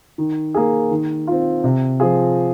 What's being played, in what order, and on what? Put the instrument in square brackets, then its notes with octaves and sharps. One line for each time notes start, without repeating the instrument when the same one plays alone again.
[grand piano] D#3
A#3 G#4
D#3
C4 F4
C3
F3 C4 F4 G#4